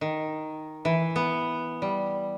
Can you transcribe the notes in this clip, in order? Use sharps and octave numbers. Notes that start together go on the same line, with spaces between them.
D#3
E3
B3
G3